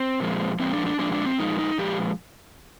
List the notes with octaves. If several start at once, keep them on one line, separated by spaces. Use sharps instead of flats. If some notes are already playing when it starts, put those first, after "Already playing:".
Already playing: C4
A#2 F3 G#3
A#2 F3 G#3 C4
D4
D4
A#2 F3 G#3 D4
D4
C4
A#2 F3 G#3 D#4
D#4
A#2 F3 G#3 G4